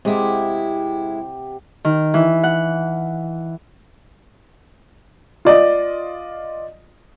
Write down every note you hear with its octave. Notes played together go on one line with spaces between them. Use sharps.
C3 G#3 E4 G4 F#5
D#3
E3
F#5
F4 D5 D#5